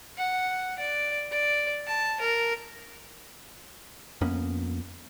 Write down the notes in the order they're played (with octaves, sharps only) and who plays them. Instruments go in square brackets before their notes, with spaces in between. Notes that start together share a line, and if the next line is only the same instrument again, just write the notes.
[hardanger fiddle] F#5
D5
D5
A5
A#4
[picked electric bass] F2 A#3 B3 C#4